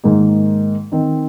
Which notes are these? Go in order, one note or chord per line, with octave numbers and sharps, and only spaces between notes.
G#2 D#3 A#3 D#4 G#4
D#3 C4 D#4